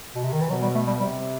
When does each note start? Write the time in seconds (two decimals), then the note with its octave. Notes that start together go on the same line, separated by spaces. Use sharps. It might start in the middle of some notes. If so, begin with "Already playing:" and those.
0.15 B2
0.24 C3
0.33 D#3
0.42 E3
0.50 B2 F#3
0.62 G3
0.75 A3
0.87 G3
1.00 C3 G3